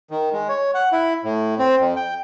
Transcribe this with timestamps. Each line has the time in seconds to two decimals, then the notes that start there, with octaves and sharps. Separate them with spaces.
0.11 D#3
0.33 G#3
0.49 C#5
0.74 F#5
0.92 E4
1.24 A2
1.59 C4
1.80 F2
1.96 G5